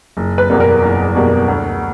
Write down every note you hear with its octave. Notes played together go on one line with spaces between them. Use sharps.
F#1
B4
E2 B2 G3 A#3
A#4
F#1
E2 B2 G3 A#3
D2